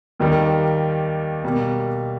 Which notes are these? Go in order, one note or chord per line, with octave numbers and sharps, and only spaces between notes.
D#2 D#3 G3 A#3
B2 G3 A#3